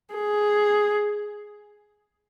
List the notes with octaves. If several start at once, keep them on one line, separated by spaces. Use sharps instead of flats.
G#4